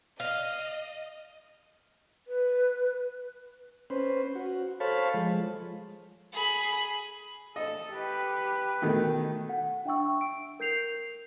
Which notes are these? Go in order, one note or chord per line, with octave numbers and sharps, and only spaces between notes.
D#5 F5
B4
C#4 B4 C5
F#4
A4 C5 C#5 F5 A5 B5
F3 G#3
G#4 B5
A4 D#5
G4 B4
B2 D#3 A3
F#5
D4 E5 G5 C#6 E6
D7
A#4 G6 C7 F7